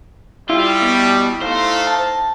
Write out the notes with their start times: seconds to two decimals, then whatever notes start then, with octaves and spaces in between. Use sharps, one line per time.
0.50 G3 E4 F4
0.82 B2
1.41 A3 D#4 C5 F5
1.87 A5